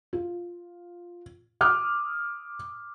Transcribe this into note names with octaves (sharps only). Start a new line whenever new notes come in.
F4
D6 D#6 F6